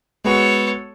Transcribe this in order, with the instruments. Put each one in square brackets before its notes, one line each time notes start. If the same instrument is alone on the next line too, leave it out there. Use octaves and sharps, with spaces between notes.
[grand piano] G#3 B3 F#4 [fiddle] A4 C#5